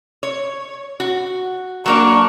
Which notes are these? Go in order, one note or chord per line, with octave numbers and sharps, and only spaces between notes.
C#5
F#4
F#3 A#3 D4 C#6